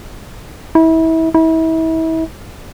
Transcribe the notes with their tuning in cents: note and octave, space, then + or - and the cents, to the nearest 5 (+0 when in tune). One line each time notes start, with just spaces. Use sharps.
E4 -30
E4 -35